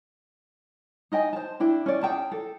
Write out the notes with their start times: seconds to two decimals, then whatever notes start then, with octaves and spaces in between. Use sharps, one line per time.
1.12 D#4 D#5 G5 G#5
1.33 C5 A5
1.60 D4 E4 G5
1.86 C#4 D5
2.03 G#4 G5 A5
2.32 A4